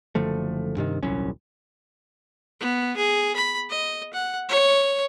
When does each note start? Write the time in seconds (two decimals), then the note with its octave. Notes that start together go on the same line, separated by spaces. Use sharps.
0.15 F#1 D3 F3 A3
0.77 G2 C3 D#3
1.03 D#1 C2 F#3 C#4
2.60 B3
2.97 G#4
3.36 B5
3.70 D#5
4.13 F#5
4.49 C#5